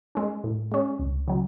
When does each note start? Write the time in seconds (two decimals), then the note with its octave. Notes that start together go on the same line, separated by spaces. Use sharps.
0.15 G#3 C#4
0.44 A2
0.72 G#3 C#4
0.99 C#2
1.28 C#3 F#3